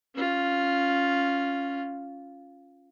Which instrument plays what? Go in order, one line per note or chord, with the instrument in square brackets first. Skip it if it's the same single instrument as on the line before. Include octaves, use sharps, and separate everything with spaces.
[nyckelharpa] C#4 F4